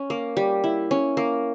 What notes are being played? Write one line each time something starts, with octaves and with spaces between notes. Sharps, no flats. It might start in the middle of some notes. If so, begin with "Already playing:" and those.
Already playing: C#4
A#3
G3
E4
C#4
A#3